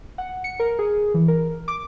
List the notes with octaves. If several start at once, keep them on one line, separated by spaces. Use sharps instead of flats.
F#5
C#7
A#4
G#4
E3
A#4
D6